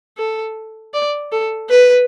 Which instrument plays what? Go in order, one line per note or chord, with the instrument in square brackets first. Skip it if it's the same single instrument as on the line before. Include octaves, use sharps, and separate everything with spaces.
[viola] A4
D5
A4
B4